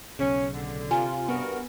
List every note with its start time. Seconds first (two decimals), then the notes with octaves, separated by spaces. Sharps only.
0.19 B1 C#3 C#4
0.54 D3
0.91 C3 F4 G#5 A#5
1.29 G2 B3 F#4 A#4